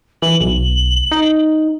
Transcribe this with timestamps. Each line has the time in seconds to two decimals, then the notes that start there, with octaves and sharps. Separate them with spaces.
0.22 E3 F#7
0.41 B1 F#7
1.12 D#4